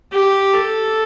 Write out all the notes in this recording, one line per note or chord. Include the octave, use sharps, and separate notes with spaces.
G4
A4